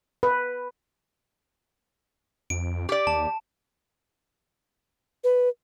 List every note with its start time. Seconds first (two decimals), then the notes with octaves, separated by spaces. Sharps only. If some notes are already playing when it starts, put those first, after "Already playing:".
0.23 B4
2.50 F2 D7
2.89 G4 D5
3.07 D#2 A5
5.24 B4